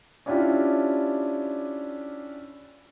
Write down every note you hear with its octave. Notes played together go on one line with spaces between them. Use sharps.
C#4 D4 E4 F4 G4